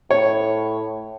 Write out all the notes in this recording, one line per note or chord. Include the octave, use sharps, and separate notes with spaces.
A2 C#5